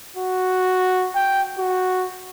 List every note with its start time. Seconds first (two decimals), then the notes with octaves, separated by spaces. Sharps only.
0.16 F#4
1.15 G5
1.59 F#4